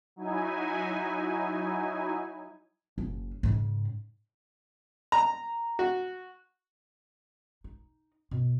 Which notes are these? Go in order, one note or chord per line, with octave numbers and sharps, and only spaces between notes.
F#3 D#4 E4 G#5
F#1
G#2 C#3
A#5
F#4
D#4
B2